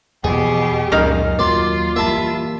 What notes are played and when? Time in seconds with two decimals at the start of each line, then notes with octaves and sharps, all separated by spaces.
0.24 E2 B2 F3 G4 G#4
0.92 C#2 F#2 A#2 D#4 F5
1.39 D#2 F#3 A#3 F4 D5 C6
1.96 E3 G3 A#3 E5 A5 B5